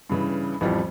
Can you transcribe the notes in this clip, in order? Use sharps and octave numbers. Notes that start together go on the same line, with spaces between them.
G2 C#3 E3
A1 F2 E3 F3 G3